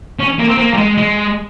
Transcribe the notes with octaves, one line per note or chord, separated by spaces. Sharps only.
C#4
A#3
C4
A#3
G3
G#3
G#3